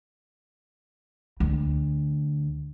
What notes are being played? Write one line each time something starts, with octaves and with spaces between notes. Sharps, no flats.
D2